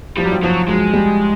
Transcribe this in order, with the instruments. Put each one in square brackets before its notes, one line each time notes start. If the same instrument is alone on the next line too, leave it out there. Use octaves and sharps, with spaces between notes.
[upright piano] F3 [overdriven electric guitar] G3
[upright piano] F#3
F3
[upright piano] F3 [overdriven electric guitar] F#3
[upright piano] F#3 [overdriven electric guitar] G#3
[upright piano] G3